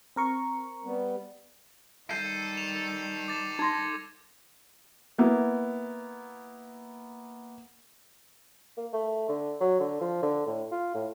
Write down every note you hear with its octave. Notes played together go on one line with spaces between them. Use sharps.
C4 A#4 C#6
G3 B3
D#3 G3 A4 G6 C7 D#7
E7 F7
D6 A6
D#4 C6 G#6 A#6
A#3 B3 E4
A#3
A3
D3
F#3
D3
F3
D3
A2
F4
A2